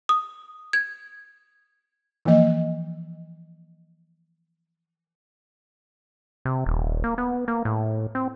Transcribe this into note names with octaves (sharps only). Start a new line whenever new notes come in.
D#6
G#6
E3 F3 A#3 D#5
C3
D#1
A#3
B3
A#3
A2
C4